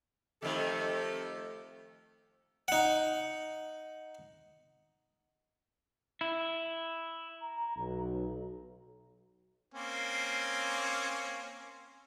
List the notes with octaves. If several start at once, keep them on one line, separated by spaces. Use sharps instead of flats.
F2 D#3 A3 G4 A4
D#4 F#5
E4
A#5
B1
A#3 C4 C#4